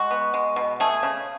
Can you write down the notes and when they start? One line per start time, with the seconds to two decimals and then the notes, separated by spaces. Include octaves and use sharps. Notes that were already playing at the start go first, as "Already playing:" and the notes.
Already playing: G#3 F#4
0.11 B3
0.34 G#3
0.56 B2
0.80 A3 G#4
1.03 C#3